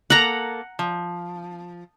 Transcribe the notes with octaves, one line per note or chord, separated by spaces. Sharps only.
A#3 A4 F#5 A#5
F3